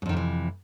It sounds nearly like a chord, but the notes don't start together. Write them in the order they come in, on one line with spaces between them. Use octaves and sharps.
G#2 F2 D#3 C3 E3